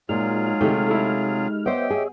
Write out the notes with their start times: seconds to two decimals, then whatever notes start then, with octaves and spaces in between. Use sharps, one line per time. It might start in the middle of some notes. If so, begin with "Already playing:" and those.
0.09 A#2 F#3 G#3 D#4 F4 G#4 F6
0.61 C3 D#3 A3 G4
0.86 A3 E4
1.66 B3 G4 C5 C#5 D#5 E5 G5
1.90 G#4